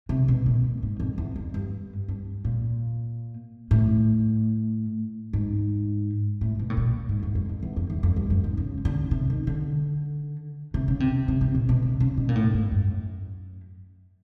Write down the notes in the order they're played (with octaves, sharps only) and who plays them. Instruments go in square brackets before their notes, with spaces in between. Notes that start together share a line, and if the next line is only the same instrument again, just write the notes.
[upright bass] C3
B2
A#2
A2
G#2
F2
E2
F2
G2
G2
A#2
A2
G#2
A2
B2
A2
A#2
G#2
E2
F2
F2
E2
F2
E2
F2
G2
F#2
G#2
C#3
D3
C3
D#3
D3
C3
C#3
C3
C3
C3
A#2
B2
C3
C#3
B2
A#2
A2
G#2
F#2